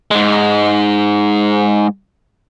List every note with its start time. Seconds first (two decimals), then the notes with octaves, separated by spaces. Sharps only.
0.11 G#2 G#3